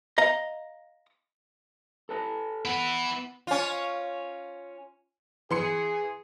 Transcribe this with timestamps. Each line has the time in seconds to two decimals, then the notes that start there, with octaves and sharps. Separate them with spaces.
0.18 D#5 F5 A#5
2.09 A4 B4 A5
2.65 B3 E4 B4
3.47 C#4 F4
5.51 E3 G#4 C6 C#7